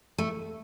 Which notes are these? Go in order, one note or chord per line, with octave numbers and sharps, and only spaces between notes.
A3